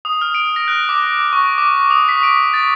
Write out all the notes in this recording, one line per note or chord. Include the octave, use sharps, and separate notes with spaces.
D#6
F6
D7
A#6
F#6
D6
C#6
D6
D#6
B6
D7
A6